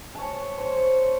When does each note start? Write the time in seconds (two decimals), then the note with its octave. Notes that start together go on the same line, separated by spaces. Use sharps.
0.15 C#5 A5
0.57 C5 C#5